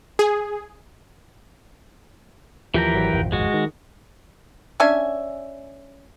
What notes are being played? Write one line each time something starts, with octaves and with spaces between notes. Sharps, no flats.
G#4
D#2 E3 F3 G4 A#4
G#1 F#3
D#1 G#1 F2
G#3 F#4
D#3
C#4 D4 E5 G#5